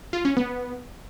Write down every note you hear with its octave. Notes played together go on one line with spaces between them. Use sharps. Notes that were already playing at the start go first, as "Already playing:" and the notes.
F4
C#4
B3